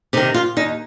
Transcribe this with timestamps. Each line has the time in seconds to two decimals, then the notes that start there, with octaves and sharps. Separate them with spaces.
0.13 C3 D#4
0.17 D#3
0.34 F4
0.57 D#2 D#4